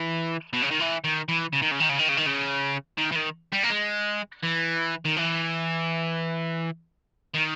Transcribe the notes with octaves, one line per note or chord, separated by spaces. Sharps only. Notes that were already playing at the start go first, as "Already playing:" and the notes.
Already playing: E3
B2
C#3
D#3
E3
D#3
E3
C#3
D#3
C#3
D#3
C#3
D#3
C#3
D#3
C#3
D#3
E3
D#3
G3
A#3
G#3
E3
D#3
E3
D#3